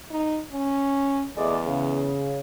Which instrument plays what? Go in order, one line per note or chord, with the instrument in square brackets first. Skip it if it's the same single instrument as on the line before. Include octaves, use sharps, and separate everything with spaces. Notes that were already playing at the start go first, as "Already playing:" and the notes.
[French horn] D#4
C#4
[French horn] E2 [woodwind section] G#3 A3 D5
[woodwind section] C#3